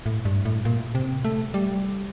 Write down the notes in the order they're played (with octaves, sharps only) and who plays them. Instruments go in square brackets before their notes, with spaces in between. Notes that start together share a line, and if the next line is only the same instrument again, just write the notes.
[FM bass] A2
G2
A2
A#2
C3
A3
G3